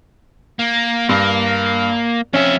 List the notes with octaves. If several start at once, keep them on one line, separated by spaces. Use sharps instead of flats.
A#3
G2 A#3
F2 C#4 E5